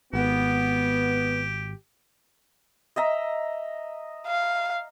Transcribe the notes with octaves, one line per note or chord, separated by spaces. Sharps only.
G#1 B3 G4
D#5 E5 A#5
F5